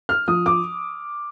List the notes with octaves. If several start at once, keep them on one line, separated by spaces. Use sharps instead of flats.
F6
F3 D#6
D6